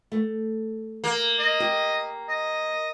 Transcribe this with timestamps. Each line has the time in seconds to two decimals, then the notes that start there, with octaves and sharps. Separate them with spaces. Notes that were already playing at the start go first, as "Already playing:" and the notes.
0.12 A3
1.04 A#3
1.39 D#5
1.60 G4
2.29 D#5